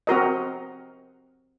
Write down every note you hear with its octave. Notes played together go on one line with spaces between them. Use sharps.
C4 F#4 A#4 D#5